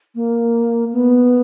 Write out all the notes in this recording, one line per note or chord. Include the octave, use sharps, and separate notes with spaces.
A#3
B3